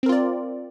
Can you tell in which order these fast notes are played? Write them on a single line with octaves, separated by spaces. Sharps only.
C4 A#4 F4 D5